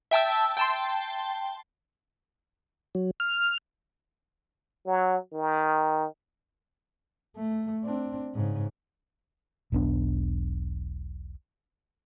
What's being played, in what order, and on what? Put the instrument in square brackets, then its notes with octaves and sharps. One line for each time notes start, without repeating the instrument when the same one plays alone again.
[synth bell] E5 G5 A5 E6
G5 A5 C6
[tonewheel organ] F#3
F6
[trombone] F#3
D#3
[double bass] A3
C4 D4
G#2 C#3
[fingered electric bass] E1 B1 B3 D4